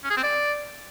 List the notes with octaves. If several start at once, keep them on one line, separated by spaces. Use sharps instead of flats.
C#4
G#4
C4
D5